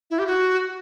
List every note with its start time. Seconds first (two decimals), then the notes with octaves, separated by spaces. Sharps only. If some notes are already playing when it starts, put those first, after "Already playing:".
0.11 E4
0.19 G4
0.27 F#4